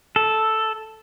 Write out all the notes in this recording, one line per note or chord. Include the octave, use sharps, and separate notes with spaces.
A4